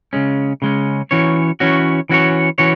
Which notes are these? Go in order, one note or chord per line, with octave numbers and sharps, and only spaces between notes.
C#3 G#3 C#4
C#3 G#3 C#4
E3 C#4 F#4 C#5
E3 C#4 F#4 C#5
E3 C#4 F#4 C#5
E3 C#4 F#4 C#5